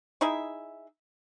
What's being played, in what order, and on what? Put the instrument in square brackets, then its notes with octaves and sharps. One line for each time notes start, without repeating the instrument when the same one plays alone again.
[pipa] D#4 E4 G#4 E5